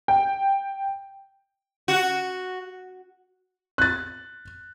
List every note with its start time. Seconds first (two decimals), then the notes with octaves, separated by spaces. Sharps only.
0.08 G5
1.88 F#4
3.78 F#6 A6